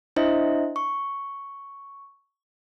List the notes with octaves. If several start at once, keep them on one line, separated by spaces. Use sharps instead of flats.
D4 E4 C5 D#5 E5
C#6